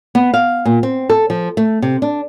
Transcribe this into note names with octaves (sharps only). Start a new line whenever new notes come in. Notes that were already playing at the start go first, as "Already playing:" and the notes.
B3
F5
A#2
C4
A4
F3
A3
C3
D4